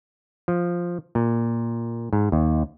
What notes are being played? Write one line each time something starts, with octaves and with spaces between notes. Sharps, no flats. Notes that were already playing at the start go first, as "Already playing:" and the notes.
F3
A#2
G#2
D#2